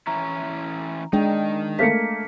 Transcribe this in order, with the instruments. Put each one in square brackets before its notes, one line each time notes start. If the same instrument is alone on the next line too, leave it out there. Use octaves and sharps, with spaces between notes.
[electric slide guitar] E3 C#4 E4 [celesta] A#5
[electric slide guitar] D#3 D#4 [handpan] G#3 D4 [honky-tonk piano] G5
[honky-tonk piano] A3 A#3 [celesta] B6 C#7